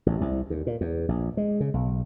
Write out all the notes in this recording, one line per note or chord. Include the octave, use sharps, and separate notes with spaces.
A1
C2
D#2
A#2
E2
A#1
G#3
C#3
B1